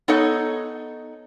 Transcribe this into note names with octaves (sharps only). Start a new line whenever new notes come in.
B3 D#4 A4 C#5 D#5 F#5